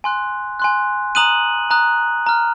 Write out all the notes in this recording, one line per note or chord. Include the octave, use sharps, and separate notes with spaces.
G#5 C6 F#6
G#5 C6 F#6
A#5 D#6 F#6 D#7 F#7
A#5 D#6 F#6
A#5 F6